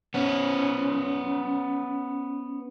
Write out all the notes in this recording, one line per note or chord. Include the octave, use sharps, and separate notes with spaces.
B3 C#4